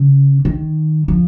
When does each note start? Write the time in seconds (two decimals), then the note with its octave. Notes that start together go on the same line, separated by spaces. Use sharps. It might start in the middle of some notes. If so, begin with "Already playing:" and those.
Already playing: C#3
0.45 D#3
1.08 F3